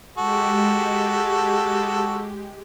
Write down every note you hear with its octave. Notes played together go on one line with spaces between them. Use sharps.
G#3 F#4 G4 A4